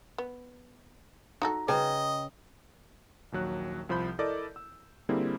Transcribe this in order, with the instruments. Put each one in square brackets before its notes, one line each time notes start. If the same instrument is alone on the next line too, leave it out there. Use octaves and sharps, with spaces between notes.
[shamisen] B3
[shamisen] D#4 F#4 A4 [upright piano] A#5
[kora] C#3 [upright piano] B4 G5 A#5 [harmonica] D#5
[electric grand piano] A#1 D#2 F#3 F#6
C2 F3 C5 B5 G6
E4 A4 A#4 D5 D#5 D6
E6
D3 G3 A#3 C4 E4 G#4